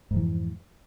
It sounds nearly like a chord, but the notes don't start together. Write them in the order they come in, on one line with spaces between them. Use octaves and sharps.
G#2 F2 E3